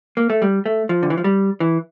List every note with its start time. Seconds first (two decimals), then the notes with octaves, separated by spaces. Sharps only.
0.17 A#3
0.30 A3
0.42 G3
0.66 A3
0.89 F3
1.03 D3
1.10 E3
1.17 F3
1.24 G3
1.60 E3